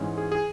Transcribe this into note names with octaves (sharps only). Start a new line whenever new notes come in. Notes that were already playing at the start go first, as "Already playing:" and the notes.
Already playing: G#2 E3 G#3 C#4
G#4
G#4